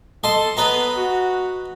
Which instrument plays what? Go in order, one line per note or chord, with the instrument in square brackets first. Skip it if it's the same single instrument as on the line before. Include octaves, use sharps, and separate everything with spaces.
[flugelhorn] A4 [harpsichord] D#5 A5 C6
[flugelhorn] B3 [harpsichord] B4 D#5 A#5
[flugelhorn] F#4